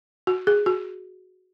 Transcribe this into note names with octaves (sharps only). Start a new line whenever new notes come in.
F#4
G#4
F#4